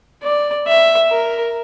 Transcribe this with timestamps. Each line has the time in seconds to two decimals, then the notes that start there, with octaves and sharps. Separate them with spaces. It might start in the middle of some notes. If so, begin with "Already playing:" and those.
0.23 D5
0.67 E5
1.11 A#4